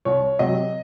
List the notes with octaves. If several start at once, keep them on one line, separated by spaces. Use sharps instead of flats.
C2 C#5
C3 F#3 D#5